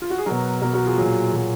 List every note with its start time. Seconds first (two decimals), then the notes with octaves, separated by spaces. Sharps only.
0.02 F4
0.10 F#4
0.18 G#4
0.26 B2 F#3 F#4 A#4
0.62 B2 F#3 F#4 A#4
0.73 F#4 A#4
0.86 F4 G#4
0.98 A#2 F#3 F4 G#4
1.33 A#2 F#3